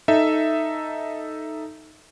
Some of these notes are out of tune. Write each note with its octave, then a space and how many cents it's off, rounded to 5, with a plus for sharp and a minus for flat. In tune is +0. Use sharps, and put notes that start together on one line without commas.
D#4 +0 A4 +0 E5 +0